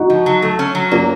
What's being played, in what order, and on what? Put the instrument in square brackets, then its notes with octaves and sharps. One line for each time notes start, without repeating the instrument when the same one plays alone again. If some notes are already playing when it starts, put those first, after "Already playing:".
Already playing: [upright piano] D#4 F#4
[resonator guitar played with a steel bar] F3
F#3
A3
C#4
F#3
[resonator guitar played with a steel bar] A#3 [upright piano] C#4 F4